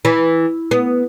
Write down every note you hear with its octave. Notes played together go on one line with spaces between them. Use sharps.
E3
B3